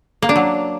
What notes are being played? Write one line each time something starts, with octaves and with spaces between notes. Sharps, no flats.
A#3
D4
F#3